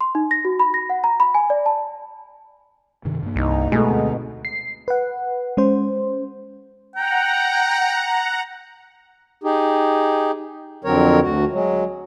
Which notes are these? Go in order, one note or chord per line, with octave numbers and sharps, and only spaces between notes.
C6
D#4
A#6
F#4
B5
A#6
F#5
A#5
B5
G#5
D5
A5
G2 C3 D#3
G2 A#3
C2 D#4
B2 G#3 A3
D2 C4
C7
B4 F#5
G#3 C#4 C5
F#5 G5 A#5
D#4 G4 G#4
F2 D3 F#3 C4 A#4 C#5
D2 F#4
F#3 G#3